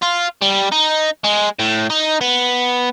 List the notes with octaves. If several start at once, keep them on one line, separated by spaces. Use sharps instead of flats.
F4
G3
D#4
G#3
A2
D#4
B3